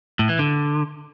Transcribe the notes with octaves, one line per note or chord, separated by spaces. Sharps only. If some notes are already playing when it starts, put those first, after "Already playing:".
A2
E3
D3